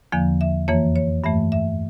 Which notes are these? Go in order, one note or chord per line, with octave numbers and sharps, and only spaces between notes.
E2 D3 F3 A#3 F5
E5
F2 E3 A#3 C#5
C#5
G2 E3 A3 E5
E5